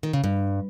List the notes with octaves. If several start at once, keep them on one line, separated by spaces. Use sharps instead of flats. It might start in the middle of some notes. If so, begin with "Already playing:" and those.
D#3
C#3
G2